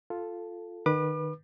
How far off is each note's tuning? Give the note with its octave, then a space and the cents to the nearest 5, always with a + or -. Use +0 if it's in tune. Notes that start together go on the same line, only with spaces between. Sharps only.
F4 +0 A4 +0
D#3 -25 B4 -15 D6 +40